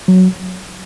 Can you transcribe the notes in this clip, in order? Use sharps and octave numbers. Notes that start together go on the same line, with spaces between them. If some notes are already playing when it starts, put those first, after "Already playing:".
F#3